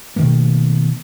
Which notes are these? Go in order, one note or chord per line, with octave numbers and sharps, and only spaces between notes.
B2 D#3 A3 A#3